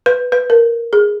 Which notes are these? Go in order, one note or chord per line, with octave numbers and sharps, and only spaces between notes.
B4
B4
A#4
G#4